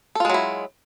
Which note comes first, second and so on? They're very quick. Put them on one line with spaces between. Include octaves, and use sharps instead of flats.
A4 F4 G#3 F#3 E4